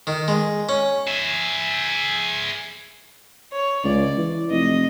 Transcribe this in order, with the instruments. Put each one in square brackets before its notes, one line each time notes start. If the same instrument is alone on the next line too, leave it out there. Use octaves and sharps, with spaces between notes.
[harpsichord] D#3
G#3
C#4
[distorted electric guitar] G#4 E5
[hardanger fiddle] C#5
[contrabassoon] C#2 [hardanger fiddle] D5
[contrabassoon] E3
[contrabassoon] F1 [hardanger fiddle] D#5